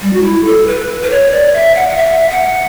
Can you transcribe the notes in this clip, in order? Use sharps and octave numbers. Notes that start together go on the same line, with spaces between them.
G3
F#4
E4
A4
B4
B4
C#5
D5
E5
F#5
F#5
E5
F#5